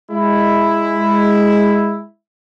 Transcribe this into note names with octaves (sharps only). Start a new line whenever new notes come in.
G#3 E4